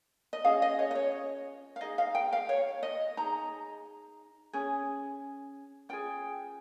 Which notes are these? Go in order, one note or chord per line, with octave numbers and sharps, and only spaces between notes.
D#5
C#4 F4 G#4 F5
D#5
C#5
D#5
C#5
F5
D#4 G#4 D#5
F5
G5
F5
C#5
D#5
D#4 G#4 A#5
C#4 G#4
C#4 F4 G#4 G5